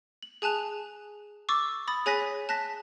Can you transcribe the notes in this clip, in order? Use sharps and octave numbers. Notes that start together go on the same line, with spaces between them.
F#7
G#4 G#5 A5 F#6 F7
C#6 D6 E6 A6
B5 D#6 A6
G#4 C#5 G#5 F#6 A#6 B6
A5 F#6 A#6 B6